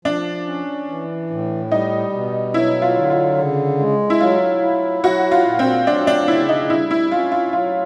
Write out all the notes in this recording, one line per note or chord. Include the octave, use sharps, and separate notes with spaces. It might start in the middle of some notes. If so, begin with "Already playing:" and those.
F3 D4
C#4
E3
A2
G3 D#4
B2
F#3 E4
F4
D3
F4
C#3
G#3
E4
F#3 F4
E4
F#3 F#4
F4
A#2
C4
F#3 D4
D4
C#3 E4
D#4
G3 E4
E4
C#4 F4
F4
F#3 F4